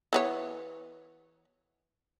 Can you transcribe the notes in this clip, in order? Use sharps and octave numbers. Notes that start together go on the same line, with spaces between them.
E3 B3 C#5